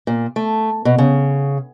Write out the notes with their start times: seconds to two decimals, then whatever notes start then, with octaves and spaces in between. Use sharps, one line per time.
0.07 A#2
0.36 A3
0.85 B2
0.98 C#3